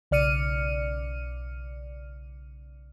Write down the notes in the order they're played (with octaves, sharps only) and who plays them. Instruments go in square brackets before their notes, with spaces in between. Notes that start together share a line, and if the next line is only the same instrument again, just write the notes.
[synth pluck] B1 C#3 D5 F6 C#7 D#7